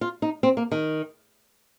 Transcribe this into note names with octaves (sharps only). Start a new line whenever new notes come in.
F4
D#4
C4
A#3
D#3